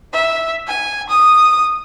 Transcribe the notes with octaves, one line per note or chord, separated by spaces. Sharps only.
E5
G#5
D#6